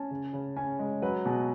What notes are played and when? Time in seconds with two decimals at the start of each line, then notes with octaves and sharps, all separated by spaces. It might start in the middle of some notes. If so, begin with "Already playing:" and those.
Already playing: C#4 A5
0.11 C#3
0.33 C#3
0.56 C#4 G#5
0.79 G#3
1.02 F#3 B4
1.25 B2 G#4